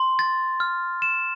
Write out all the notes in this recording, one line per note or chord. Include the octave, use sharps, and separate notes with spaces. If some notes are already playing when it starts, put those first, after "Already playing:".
Already playing: C6
A6
F6
E7